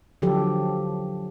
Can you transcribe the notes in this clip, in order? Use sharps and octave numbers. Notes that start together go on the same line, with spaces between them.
D3 F3 F#3 G4 A4